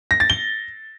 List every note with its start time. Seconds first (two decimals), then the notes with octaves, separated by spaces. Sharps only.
0.11 A#6
0.20 A6
0.30 G7